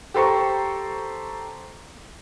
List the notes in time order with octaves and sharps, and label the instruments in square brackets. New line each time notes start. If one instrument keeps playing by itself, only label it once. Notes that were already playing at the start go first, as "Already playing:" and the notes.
[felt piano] G4 A4 C5 A#5 C#6